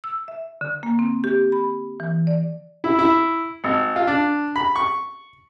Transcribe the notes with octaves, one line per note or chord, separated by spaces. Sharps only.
E6
E5
D3
A#3
C4
G4
B5
E3
D5
E4
E4
G#1
F4
D4
B5
C#6